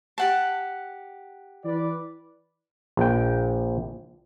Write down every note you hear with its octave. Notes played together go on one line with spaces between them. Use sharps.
G4 F#5 A5
E3 B4 D5
A#1 G5